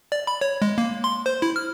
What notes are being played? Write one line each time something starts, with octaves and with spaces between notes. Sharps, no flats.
D5
B5
C#5
G#3
A#3
C6
C5
E4
F6